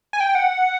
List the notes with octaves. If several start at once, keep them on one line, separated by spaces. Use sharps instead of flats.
G#5
G5
F#5